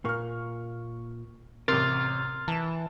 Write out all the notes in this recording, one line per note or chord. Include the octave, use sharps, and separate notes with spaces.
A#2 A#3 C#6 F6
A1 C3 A#4 C6 F6 A6
E3 A5 E7